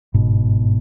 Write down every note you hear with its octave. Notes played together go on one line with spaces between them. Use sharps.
G1 G#2 B2